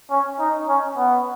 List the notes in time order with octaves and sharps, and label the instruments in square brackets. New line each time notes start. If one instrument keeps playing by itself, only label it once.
[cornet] C#4
D#4
C#4
B3